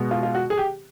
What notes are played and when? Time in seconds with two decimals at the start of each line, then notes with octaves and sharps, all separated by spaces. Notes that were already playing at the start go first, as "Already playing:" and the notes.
Already playing: B2 G#3 B3
0.11 F4
0.23 F4
0.35 F#4
0.50 G#4
0.57 G4